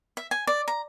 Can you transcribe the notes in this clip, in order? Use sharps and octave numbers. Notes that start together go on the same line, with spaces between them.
E5
G#5
D5
A#5